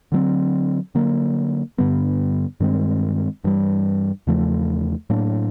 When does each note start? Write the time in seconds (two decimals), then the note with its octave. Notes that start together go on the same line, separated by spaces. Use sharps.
0.12 D3 F#3 A3 C4
0.95 D3 F#3 A#3
1.78 G2 D3 G3 B3
2.60 G2 D#3 G#3 C4
3.44 G2 E3 G3
4.27 E2 C#3 F3 A3
5.10 A2 F#3 A#3 D4